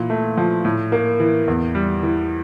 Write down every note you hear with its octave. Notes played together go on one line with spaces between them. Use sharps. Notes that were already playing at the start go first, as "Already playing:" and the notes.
Already playing: A#2 E3
A3
F3
A2
A#3
E3
E2
G3
E3